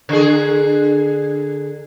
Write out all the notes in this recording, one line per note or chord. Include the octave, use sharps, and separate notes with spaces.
D3 G#4